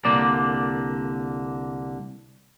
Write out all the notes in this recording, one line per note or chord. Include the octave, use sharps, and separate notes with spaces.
C2 D3 A#3 D5